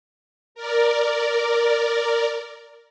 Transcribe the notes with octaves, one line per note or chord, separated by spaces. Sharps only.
A#4 D5